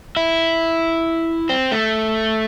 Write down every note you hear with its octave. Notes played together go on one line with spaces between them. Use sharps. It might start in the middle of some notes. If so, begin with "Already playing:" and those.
E4
C4
A3